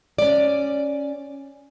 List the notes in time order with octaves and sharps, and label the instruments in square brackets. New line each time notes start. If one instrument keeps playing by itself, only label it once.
[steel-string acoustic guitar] C#4 D5